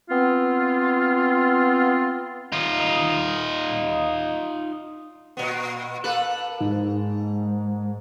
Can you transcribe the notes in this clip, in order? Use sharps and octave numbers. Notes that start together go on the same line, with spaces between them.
B3 C4 F4
D#4 F4
A#2 B3
A#3 A4 B4 F#6
G#2